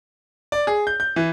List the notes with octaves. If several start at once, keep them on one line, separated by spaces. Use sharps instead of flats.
D5
G#4
G6
G6
E3